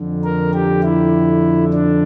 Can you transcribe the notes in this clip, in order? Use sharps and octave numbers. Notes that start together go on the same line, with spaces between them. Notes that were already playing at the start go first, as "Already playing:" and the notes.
Already playing: F2 D3
A#4
G4
E4
D4